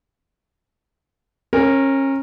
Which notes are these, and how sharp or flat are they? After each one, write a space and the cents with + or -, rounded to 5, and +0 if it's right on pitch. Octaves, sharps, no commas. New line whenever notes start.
C#4 -30 A#4 -5